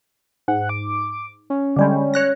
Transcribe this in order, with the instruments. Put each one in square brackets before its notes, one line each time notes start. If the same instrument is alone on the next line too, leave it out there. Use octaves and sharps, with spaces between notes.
[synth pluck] G#2 [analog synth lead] F#5
[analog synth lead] D6
C#4
[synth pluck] D3 G3 G#3
C#5 F#6 A#6